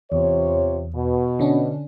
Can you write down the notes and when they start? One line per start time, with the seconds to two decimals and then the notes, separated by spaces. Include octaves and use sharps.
0.12 E2 C3 F4 C#5
0.94 B2
1.39 D3 C#4 D4